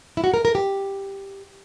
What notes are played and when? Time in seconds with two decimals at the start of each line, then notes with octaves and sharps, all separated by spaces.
0.17 E4
0.24 F#4
0.34 A#4
0.45 A#4
0.55 G4